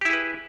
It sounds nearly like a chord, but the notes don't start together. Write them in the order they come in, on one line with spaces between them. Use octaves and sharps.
G4 E4 G#4 B4